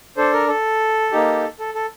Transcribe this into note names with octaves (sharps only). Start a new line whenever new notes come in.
D4 A4 C5
A#4
A4
A#3 D#4 G4
A4
A4